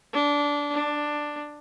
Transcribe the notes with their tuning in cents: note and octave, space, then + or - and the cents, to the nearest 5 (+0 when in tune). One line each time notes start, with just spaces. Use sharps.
D4 -15
D4 +10